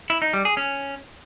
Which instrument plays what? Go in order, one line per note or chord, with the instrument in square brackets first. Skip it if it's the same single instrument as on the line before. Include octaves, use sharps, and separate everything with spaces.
[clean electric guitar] E4
D#4
G3
G#4
C#4